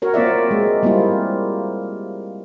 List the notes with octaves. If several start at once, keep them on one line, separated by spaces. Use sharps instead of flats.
F#4 A#4 C#5
A#3 C4 F4 D5 E5
G#3
G3 A#3 C4 E4 F4